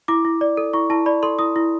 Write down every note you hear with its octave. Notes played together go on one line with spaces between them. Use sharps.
E4 D6
E4
D5
A4
E4 C#6
E4 A5
D5 B5
A4 C6
E4 D#6
E4